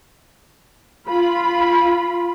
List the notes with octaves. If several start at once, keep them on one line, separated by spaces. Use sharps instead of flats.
F4 B5